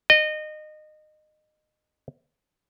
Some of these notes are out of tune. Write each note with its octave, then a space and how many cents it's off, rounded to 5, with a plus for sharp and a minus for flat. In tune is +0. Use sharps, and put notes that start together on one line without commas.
D#5 -25